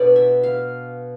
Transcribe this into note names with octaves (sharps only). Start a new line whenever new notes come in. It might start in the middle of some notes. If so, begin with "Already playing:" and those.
Already playing: B2 B3 D4 D5
E5
F5